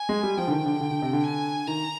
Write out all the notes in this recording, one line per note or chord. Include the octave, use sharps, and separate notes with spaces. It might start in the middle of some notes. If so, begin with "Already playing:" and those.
Already playing: G#5
G#3
G3
F3 G5
D3
D#3
D3
D3
D3
C3
D3
G#5
D#3 A#5